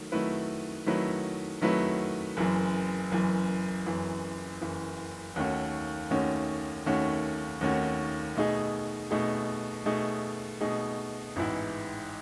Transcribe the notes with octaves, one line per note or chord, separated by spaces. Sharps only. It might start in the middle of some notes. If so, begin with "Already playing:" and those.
Already playing: D#3 F#3 A3
D#3 F#3 A3 E4 B4
D#3 F#3 A3 E4 B4
D#3 F#3 A3 E4 B4
F#1 F#2 E3
F#1 F#2 E3
F#1 F#2 E3
F#1 F#2 E3
D#2 D#3 A3 C#4 F#4
D#2 D#3 A3 C#4 F#4
D#2 D#3 A3 C#4 F#4
D#2 D#3 A3 C#4 F#4
B2 A3 D#4 G#4
B2 A3 D#4 G#4
B2 A3 D#4 G#4
B2 A3 D#4 G#4
A1 G#2 E3 B3 E4